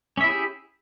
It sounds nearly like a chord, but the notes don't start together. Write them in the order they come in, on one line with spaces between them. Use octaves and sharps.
C#4 E5 E4 G#4 G4